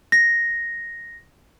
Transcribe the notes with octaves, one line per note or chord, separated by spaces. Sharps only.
A#6